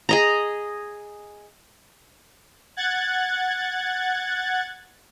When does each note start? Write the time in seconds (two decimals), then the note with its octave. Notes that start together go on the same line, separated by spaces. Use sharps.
0.09 G#4 D#5 A#5
2.77 F#5 F#6 G#6 A6